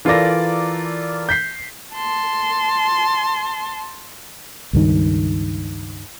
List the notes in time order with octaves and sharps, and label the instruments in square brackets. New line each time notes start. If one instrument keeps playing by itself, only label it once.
[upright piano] E3 F4 A4 A#4 D5 A#6
G6 B6 C7
[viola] A5 C6
[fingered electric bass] C#2 G2 D#3